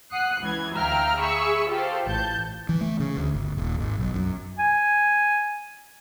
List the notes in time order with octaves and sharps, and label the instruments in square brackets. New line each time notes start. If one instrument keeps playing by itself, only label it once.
[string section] F#5 D#6 F#6 C7
C#2 E3 G#6
D2 E5 F5 G5 A#5 F6
G#4 E5 B5 C#6 E6
F4 G4 A4 C5 F5
A1 A5 G6
[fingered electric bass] E3
A3
C#3
D2
G1
D#1
G#1
B1
F#2
[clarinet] G#5